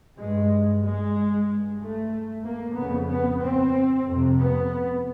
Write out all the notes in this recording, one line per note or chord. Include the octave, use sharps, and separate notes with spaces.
G2 G#3
G#3
G2
A3
A#3
F2 C#3 B3
B3
C4
F2 C3
B3